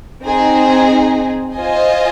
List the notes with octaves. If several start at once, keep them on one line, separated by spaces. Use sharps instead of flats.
C4 D#4 G#4
F4 C5 D#5 G#5